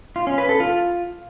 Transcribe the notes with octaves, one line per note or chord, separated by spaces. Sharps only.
F4
C#4
B4
A4
F4